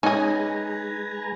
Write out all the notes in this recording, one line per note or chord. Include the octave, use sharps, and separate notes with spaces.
G#3 C#4 D#4 G#4 B4 G#5 A#5